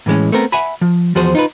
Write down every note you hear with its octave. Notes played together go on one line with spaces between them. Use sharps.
A2 E3 G#3 C#4
A3 B3 C4 A#4
E5 F#5 G#5 B5
F3
E2 F3 F#4 G#4 C5
D#4 F4 B4